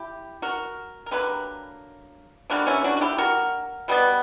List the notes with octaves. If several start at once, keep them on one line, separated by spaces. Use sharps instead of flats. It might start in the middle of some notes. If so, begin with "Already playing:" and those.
Already playing: E4 G4
F#4 A#4
A#4
D3 F#3 A#3 G4 B4
D3 G3 A#3 D4 F#4
C#4 E4
D4 F#4
F#4
E4 G4
F#4 A#4
B2 G3 B3